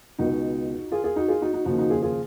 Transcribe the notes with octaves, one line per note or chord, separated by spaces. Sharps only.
C#2 B2 D#4 F#4
F4 G#4
F4 G#4
D#4 F#4
F4 G#4
D#4 F#4
D#4 F#4
D#2 C#3 F3 D#4 F#4
D#4 F#4
F4 G#4
F4 G#4